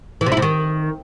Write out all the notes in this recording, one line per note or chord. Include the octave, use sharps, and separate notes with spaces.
E3
C3
E4
C3
D#3